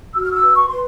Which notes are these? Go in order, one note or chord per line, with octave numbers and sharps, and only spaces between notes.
F#4 E6
F6
E6
B4
C#6
B4 C6